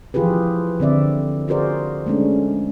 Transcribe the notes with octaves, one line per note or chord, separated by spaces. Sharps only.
E3 F3 F4 G4 G#4 B4
D3 C4 D5 E5
F4 F#4 G#4 A#4 C5 D5
G#3 A3 C#4 D4